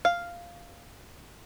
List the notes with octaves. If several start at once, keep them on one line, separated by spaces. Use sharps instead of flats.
F5